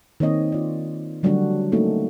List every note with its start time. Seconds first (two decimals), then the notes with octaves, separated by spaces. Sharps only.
0.20 D#3 A#3 C4 C#5 D#5
0.52 F4 D5
1.23 D3 F#3 G3 A3 D4 F#4
1.72 A3 A#3 C#4 D#4 F#4 A4